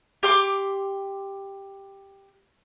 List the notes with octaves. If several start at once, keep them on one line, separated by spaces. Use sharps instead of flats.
G4 C6 D6